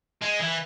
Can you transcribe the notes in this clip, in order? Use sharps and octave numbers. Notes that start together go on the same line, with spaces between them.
G#3
E3